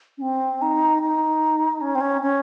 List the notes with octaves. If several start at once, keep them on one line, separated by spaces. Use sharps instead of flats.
C#4
C4
D#4
D#4
C#4
C4
C#4
C#4